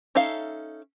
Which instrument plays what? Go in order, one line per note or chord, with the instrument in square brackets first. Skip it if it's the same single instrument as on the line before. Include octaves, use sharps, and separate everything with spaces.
[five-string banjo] C#4 D#4 A4 E5 F5